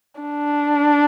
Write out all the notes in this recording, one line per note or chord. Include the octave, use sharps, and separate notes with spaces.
D4